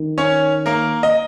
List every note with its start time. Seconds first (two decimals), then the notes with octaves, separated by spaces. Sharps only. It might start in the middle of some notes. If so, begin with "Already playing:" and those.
Already playing: D#3
0.18 C#4 C#5
0.66 A#3 A#4
1.03 D#5